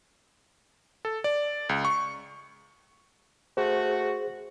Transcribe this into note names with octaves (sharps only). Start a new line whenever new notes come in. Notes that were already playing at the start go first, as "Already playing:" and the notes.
A4
D5
C#2
C#6
A3 F#4 G#4 C5